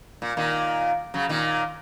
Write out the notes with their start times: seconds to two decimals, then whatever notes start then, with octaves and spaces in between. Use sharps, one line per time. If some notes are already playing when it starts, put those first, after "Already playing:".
0.22 A#2
0.37 A#2 D#3
1.14 C#3 F#3
1.29 A#2 D#3